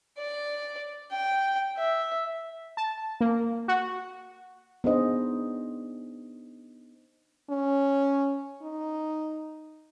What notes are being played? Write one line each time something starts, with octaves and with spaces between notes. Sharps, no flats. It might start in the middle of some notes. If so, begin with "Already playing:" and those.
D5
G5
E5
A5
A#3
F#4
B3 D4 D#4 G#4 C5 D#5
C#4
D#4